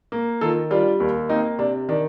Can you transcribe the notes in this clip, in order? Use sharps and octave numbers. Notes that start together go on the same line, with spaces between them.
A#3
D#3 F4 A4
G3 D4 F4
D#2
A#3 C4 D#4
C3 D4
D#3 D4